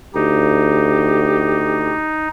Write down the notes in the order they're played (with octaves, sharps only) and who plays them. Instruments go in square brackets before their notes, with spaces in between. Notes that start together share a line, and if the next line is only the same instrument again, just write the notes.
[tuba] D2 [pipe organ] D#4 [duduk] G4